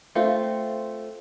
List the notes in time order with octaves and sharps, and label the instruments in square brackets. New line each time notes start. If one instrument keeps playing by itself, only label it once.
[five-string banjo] A3 C4 F4